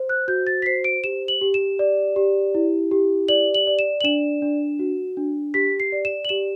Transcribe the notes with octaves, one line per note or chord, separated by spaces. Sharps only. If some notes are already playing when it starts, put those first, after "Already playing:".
Already playing: C5
F#6
F#4 G6
A6
B6
C5 C7
D7
G4 E7
F#7
G4
E7
D5
G4
E4
G4
D5 F#7
F#7
D5
E7
F#7
D4 E7
D4
F#4
D4
G4 B6
C7
D5
E7
F#7
G4 E7